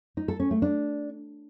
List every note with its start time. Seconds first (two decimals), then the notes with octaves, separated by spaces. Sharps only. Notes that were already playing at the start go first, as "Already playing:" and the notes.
0.17 D#4
0.28 A4
0.40 C#4
0.51 A3
0.62 D4